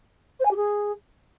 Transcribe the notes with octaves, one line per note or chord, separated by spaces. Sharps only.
C5
G#5
G4
G#4